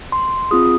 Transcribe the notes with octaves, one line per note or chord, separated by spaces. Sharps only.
C6
C4 F4 G#4 D#6